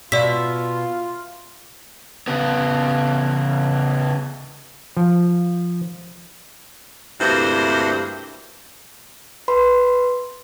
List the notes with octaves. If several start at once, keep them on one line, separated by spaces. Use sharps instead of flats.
B2 F4 D5 E5 B6
C#3 B3
F3
D2 G2 C3 A#3 E4 C5
B4 B5 C6